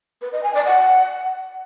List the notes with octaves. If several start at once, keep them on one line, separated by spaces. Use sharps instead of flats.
B4
D#5
G#5
D5
F#5